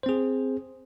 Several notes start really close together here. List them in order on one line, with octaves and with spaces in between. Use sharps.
C5 C4 G#4